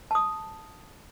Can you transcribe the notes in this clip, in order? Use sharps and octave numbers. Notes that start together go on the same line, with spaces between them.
A5 D#6